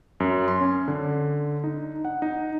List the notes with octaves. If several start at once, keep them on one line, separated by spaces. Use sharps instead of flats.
F#2
C6
C#4
D3
D#4
F#5
D#4